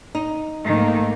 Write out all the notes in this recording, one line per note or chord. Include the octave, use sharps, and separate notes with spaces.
D#4
G#2 D#3 A3 A#3